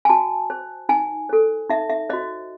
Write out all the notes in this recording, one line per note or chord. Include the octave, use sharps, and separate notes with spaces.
G#5
F#4 A5
C5
D#4 G#5
A4 C5
D#4 E5
E5
F#4 C5 D#5